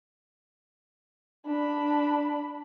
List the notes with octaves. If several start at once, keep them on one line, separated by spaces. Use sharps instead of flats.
D4 B5